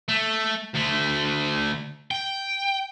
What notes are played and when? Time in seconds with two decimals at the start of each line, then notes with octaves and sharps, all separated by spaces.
0.08 A3
0.75 D2 A3
2.11 G5